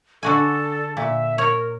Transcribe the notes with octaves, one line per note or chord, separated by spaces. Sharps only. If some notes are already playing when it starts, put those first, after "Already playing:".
D3 F#4 A4 G#5
A#2 E5
A#4 C#5